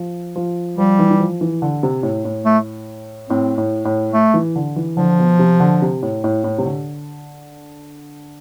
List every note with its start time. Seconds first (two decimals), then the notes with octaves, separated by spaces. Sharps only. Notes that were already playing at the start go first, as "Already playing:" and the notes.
Already playing: F3
0.36 F3
0.77 F3 G3
0.99 E3
1.11 E3
1.20 F3
1.41 E3
1.62 D3
1.83 C3
2.03 A2
2.25 A2
2.46 A3
3.29 A2 C4
3.58 A2
3.85 A2
4.14 A3
4.34 E3
4.56 D3
4.76 E3
4.97 D3 F3
5.19 B2
5.39 C3
5.60 D3
5.82 C3
6.03 A2
6.24 A2
6.44 A2
6.58 C3
6.65 D3